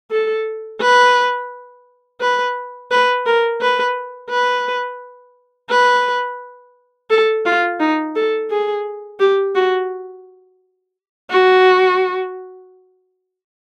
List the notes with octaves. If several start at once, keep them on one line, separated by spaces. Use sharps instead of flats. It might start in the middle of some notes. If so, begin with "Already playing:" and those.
A4
B4
B4
B4
A#4
B4
B4
B4
A4
F4
D#4
A4
G#4
G4
F#4
F#4